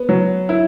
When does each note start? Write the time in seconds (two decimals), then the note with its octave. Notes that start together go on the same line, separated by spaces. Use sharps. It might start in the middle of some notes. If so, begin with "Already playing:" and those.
Already playing: B3
0.09 F#3
0.49 E4